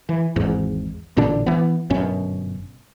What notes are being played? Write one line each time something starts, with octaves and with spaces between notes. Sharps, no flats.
E3
G#1 E2 G#2
A1 A#2 D3 D4
E3 B3
G1 F#2 B2 C#4